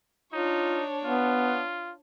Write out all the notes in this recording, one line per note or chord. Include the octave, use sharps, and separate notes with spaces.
D4 D#4 F4 C#5
B3 F4